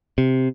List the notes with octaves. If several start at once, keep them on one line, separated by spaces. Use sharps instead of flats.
C3